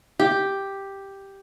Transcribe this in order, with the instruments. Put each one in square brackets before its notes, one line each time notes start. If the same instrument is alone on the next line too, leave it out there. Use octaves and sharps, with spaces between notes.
[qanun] G4